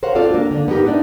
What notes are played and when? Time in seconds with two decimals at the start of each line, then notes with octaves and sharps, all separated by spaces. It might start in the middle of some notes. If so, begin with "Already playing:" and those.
0.03 A#4 C5 C#5 F5 F#5
0.15 C4 F4 F#4 A4 D5 F5
0.31 A#3 D4
0.51 D3 A#3 D4
0.68 B3 D4 D#4 G4 A#4
0.85 B3 D4 D#4 D5 E5